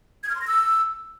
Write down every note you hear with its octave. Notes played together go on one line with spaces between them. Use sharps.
G#6
F6
C6
A#6
E6